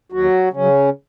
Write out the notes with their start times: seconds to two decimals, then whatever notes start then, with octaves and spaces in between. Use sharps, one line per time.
0.12 D#2 F#3 F#4
0.53 C#3 F#3 C#4